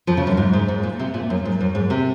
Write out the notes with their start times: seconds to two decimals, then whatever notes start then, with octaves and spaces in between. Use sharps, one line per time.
0.07 F2 F3
0.17 C#3
0.27 F#2
0.37 G#2
0.53 G#2
0.68 G#2
0.83 A#2
0.99 C3
1.14 A#2
1.30 F#2
1.45 G#2
1.61 F#2
1.75 G#2
1.90 C3